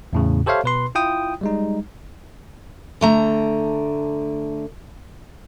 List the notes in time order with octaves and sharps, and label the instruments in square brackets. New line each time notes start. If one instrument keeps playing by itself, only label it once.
[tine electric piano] E2 A2 C#3
G4 A4 C5 C#5 E5 F5
B2 B4 C6
E4 F4 G5 D#6
G3 G#3 D#4
[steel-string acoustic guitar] D3 A3 A#5